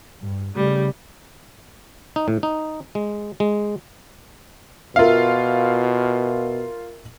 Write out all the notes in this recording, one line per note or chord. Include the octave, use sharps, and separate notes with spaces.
G2
C#3 G3 A3
D#4
A2
D#4
G#3
G#3
B2 F4 A#4 E5 F5